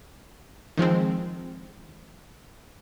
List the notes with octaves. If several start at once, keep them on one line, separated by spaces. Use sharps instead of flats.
D#3 F3 G#3 C4